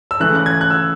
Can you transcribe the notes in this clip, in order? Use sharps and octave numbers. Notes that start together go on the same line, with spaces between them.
E6
C#3 E3 A3 F#6
F#6
G#6
F#6
E6